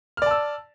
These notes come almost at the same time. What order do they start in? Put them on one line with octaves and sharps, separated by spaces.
F6 D5 A5 E6